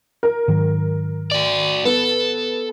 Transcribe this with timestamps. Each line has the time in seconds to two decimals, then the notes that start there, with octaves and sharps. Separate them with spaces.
0.23 A#4
0.48 G#2 D#3 F#3
1.31 F#4 D5
1.85 B3 A4